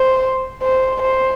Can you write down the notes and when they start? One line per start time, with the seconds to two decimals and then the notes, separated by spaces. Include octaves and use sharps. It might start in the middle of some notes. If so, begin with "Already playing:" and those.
Already playing: C5
0.62 C5
1.01 C5